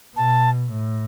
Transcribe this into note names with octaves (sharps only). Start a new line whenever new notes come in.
B2 A5
A2